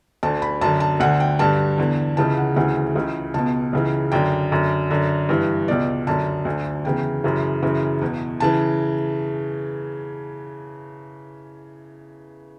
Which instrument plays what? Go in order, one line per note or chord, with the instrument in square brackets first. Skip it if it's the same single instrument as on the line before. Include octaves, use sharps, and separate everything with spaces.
[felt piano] D2 D3 A5
B5
F#2 D3 A5
A5
D2 D3 F#5
G5
G2 D3 A5
E2 D3
C#2 C#3 E3 A5
F#5
D2 C#3 E3 F#5
C#2 C#3 E3
C#2 B2 A5
C#2 C#3 E3
F#2 D3 G5
F#2 D3
F#2 D3
G2 E3
C#2 B2 D5
F#2 D3 A5
D2 D3
E2 C#3 E3 G5
F#2 C#3 E3
F#2 C#3 E3
E2 B2
C#3 E3 A5